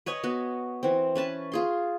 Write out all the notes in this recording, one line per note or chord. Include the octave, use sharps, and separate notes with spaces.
B4 C#5 D#5 G#5
B3 F#4
E3 C4
C#4 B4 A5
F4 G#4 C6